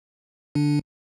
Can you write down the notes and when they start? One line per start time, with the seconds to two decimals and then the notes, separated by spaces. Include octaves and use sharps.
0.55 D3 D4